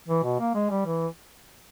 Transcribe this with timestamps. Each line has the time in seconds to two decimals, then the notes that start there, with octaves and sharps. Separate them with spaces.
0.08 E3
0.24 B2
0.39 A#3
0.55 G#3
0.70 G3
0.86 E3